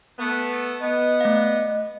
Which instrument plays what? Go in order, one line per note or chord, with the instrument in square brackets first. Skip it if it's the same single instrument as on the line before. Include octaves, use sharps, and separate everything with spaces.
[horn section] A3 B3
[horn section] B3 [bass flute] D#5
[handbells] A3 F5